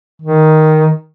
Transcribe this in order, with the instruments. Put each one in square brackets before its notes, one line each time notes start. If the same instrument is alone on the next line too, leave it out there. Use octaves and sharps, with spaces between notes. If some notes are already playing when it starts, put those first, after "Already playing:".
[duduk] D#3